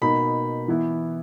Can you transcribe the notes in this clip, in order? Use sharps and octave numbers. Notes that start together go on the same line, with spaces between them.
B2 A#3 D#4 B5
E3 B3 E4